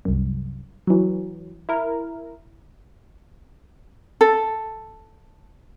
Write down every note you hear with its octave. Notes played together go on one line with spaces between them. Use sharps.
C2 F#2
E3 F#3
E4 A#4
A4